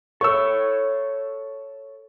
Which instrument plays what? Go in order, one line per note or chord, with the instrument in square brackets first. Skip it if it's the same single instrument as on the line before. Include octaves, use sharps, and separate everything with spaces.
[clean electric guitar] A4 C#5 [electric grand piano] C#6 E6